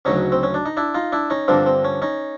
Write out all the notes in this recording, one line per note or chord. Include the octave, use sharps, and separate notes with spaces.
D2 C#3 F#3 C#4 D#4
C4
C#4
D4
D#4
D4 E4
D#4 F4
D4 E4
C#4 D#4
G2 D3 F3 A#3 C4 D4
C4
C#4
C#4 D#4